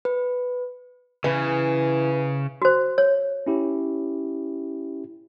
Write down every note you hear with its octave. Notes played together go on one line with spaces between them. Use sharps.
B4
C#3 E3
F#4 C5
C#5
C#4 E4 G4